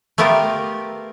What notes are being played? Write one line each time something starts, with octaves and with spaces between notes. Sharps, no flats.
A3 B3 F4 G4 A#4